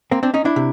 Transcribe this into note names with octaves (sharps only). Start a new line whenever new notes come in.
A#3 C4
C4 D4
C#4 D#4
D4 E4
C3